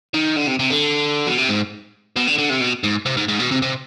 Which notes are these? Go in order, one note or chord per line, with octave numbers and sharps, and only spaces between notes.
D#3
D3
C3
C3
D3
B2
C3
G#2
B2
D3
D3
C3
B2
G#2
C3
G#2
G#2
B2
C3
C3